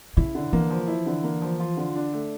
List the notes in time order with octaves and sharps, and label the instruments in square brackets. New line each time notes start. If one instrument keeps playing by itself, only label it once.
[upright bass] C#3 [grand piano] E4
[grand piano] D3
[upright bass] E3 [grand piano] A#3
[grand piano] F3
E4
D3
A#3
F3
F4
D3
D4
A3